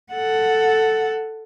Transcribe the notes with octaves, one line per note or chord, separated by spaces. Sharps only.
A4 F#5